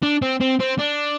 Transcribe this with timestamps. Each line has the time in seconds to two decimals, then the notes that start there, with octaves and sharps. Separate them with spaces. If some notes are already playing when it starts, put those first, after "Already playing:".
0.03 D4
0.22 C4
0.40 C4
0.60 C4
0.79 D4